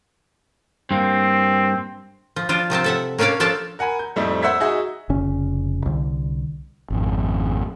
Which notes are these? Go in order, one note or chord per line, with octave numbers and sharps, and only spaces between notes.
G2 A#3 C4
F3
F3 D4 F4
C3 F3 C4 A5
A4 E5 F#5
A#3 C#4 D4 C#5 D5 F5
F3 D4 A4 F5 A5
A#4 F#5 G#5 B5
G6
F2 A2 G3 A3 C4 D#4
C5 E5 F#5 E6 G#6 B6
D#4 F#4 G#4 D#5 E5
F1 C#3 C#4
C2 D3
G#1 F2